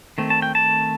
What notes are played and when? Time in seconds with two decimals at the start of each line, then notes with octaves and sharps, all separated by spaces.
0.18 D#3 A3 C4
0.30 A5
0.42 G5
0.55 A5